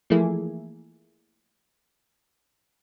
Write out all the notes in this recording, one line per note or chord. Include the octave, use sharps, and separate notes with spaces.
E3 F3 A3 A#3 E4 G#4